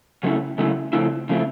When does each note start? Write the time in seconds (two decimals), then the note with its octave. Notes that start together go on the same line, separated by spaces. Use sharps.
0.23 C#3 F#3 A3 C#4 E4
0.58 C#3 F#3 A3 C#4 E4
0.93 C#3 F3 A3 C4 E4
1.29 C#3 F3 A3 C4 E4